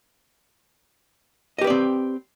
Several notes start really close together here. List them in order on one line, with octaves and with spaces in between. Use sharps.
D#5 G4 B4 D5 C4